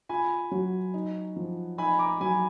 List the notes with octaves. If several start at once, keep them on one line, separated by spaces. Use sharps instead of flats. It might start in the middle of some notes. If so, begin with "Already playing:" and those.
F4 G#5 B5
F#3
D#4
F3
D#4 G#5 B5
A#5 D6
F#3 G#5 B5